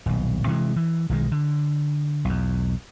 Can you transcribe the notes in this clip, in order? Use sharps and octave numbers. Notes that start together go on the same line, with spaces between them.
D#1 B1
C3 E3 G#3
E3
B1 D#3 G#3
D3
B1 E2